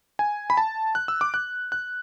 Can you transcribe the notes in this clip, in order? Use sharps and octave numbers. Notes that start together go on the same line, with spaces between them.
G#5
B5
A5
F#6
E6
D6
F#6
F#6